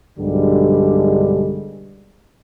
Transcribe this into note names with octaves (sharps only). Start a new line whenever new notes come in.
B1 G2 D3 G3 G#3